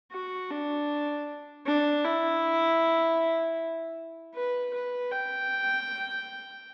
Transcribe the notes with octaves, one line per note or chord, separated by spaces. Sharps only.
F#4
D4
D4
E4
B4
B4
G5